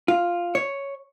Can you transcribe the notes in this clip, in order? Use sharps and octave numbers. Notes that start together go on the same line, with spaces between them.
F4
C#5